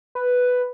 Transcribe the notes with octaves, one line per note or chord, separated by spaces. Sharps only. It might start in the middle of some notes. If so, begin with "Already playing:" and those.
B4